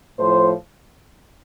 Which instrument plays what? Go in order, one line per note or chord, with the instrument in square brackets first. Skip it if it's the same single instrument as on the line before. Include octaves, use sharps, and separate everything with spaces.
[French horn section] A2 F3 C5